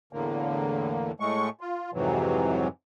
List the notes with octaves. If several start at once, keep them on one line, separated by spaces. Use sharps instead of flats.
E2 A2 D3 A#3
A2 G#3 A3 C#6
F4
F2 G#2 C3 E3 F#3